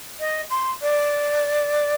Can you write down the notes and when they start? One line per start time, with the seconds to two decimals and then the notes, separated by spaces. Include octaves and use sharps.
0.20 D#5
0.50 C6
0.82 D5